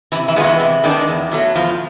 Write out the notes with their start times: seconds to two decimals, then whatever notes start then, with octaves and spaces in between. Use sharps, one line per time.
0.12 C3 E3 E4
0.28 E3 E4
0.36 D#3 G#3 B3 D4 F4
0.44 E3 E4
0.60 C3
0.84 D#3 G#3 B3 D4
1.08 E2
1.31 B2 F#3 A3
1.56 E2 F3 F4